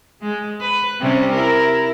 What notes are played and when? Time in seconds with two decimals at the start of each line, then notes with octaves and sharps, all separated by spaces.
0.22 G#3
0.61 B4
1.00 C3 G3 C#4
1.33 E4 A#4